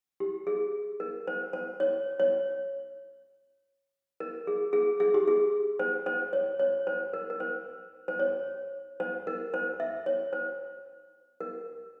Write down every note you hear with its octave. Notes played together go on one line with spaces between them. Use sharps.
G4
G#4
A#4
C5
C5
C#5
C#5
A#4
G#4
G#4
G#4
G4
G#4
C5
C5
C#5
C#5
C5
A#4
A#4
C5
C5
C#5
C5
A#4
C5
E5
C#5
C5
A#4